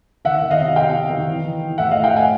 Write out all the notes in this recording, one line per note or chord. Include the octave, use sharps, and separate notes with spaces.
D#3 E5 F#5
D#3
D#5 F5
C3
C3 F5 G5
C3
D#3
E3
E3
E3
A2 E5 F#5
A2 D#5 F5
F5 G5
A2 F#5 G#5